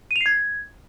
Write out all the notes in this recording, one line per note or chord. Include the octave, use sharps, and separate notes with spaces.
D#7
F7
C7
G#6